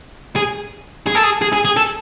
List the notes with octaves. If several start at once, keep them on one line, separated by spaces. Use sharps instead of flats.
G#4
G#4
A4
G#4
G#4
G#4
G#4
A4